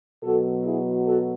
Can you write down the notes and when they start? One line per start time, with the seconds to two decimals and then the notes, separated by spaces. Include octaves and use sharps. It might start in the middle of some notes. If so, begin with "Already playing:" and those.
0.23 B2 F#3 F#4 A4
0.64 E4 G#4
1.05 F#4 A4